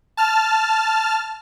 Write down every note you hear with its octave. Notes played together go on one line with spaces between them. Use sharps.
A5 F6